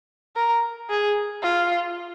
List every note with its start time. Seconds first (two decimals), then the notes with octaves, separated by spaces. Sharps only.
0.36 A#4
0.90 G#4
1.43 F4